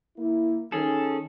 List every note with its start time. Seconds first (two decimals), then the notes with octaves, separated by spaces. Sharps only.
0.18 A#3 E4
0.72 D#3 C#4 G#4 A4